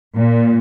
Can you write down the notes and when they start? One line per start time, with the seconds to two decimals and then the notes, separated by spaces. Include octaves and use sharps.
0.16 A#2